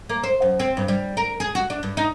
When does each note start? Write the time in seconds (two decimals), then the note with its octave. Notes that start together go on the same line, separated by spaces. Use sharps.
0.09 A#3
0.23 C5
0.42 F#2
0.60 C4
0.77 G2
0.88 G3
1.17 A#4
1.40 G#4
1.55 F#4
1.70 D4
1.83 G2
1.97 D#4